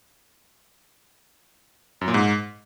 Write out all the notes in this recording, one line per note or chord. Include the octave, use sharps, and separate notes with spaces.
F#2
A#2
G#2